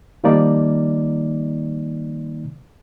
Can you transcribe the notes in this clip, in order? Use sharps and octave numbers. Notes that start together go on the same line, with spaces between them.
D#3 F3 G3 A#3 D#4 D5